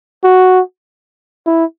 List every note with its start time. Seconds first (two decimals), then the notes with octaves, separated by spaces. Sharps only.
0.24 F#4
1.46 E4